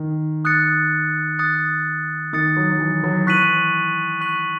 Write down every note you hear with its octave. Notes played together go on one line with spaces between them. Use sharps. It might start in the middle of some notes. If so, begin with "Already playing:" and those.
Already playing: D#3
D#6 F#6 A6 C#7
D#6 F#6 A6 C#7
D#3 D#6 F#6 A6 C#7
F#3
F#3
E3
F#3
E3 C#6 F#6 B6 D#7 F#7
C#6 F#6 B6 D#7 F#7